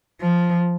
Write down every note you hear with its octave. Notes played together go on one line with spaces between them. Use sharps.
F3